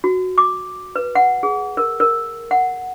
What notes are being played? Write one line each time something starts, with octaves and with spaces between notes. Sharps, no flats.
F#4
D6
B4
F#5
G#4
A#4
A#4
F#5